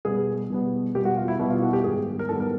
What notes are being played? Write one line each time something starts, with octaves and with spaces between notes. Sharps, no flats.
B2 G3 B3 G#4
B2 G3 B3
B2 G3 B3 G4
F#4
F4
E4
B2 G3 B3 E4
F4
F#4
G4
G#2 D#3 G3 B3 G#4
A#4
G#2 D#3 G3 B3 A4
A#4